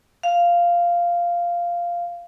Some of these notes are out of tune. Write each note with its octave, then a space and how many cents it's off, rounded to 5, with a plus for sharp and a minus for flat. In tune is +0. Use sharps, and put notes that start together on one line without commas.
F5 -5